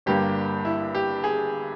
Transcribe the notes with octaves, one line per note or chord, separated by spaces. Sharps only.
G1 G2 G3 A#3 G4
E4
G4
G#4